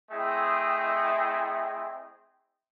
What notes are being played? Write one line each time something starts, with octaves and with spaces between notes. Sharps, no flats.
A3 C4 E4 G#4 D#5 G5